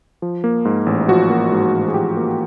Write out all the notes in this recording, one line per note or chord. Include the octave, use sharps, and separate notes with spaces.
F3
A#3
G#2
A1
F3 F#4
A#3
G#2
A1
G#4
F3 G4
A#3